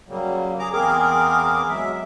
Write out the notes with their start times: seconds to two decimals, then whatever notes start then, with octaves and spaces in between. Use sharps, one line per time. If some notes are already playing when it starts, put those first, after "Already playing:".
0.08 C#3 F#3 G3 A#3
0.59 G#4 A#5 D6
0.72 E2 A#3 C4 G#4 A#4 D6
1.69 F#3 G#3 E5